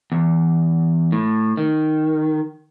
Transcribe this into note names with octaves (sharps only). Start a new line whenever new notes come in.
E2
A2
D#3